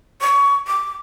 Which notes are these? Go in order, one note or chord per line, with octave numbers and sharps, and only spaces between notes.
C#6
D6